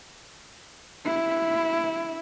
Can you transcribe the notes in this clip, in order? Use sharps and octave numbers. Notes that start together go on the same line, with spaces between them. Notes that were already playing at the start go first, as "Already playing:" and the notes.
E4